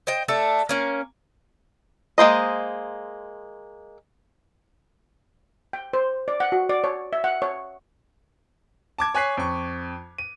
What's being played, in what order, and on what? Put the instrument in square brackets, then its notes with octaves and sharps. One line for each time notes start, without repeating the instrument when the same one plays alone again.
[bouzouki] C5 D#5 G5
A3 D4 A4
A#3 C#4
[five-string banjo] G#3 A#3 C5 D#5
[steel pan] G5
C5
D5
F#5
F#4
D5
C#5
E5
F#5
C#5
[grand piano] A5 D6 G#6
C#5 G#5 F#6 B6 C7
F2 C#6
D#7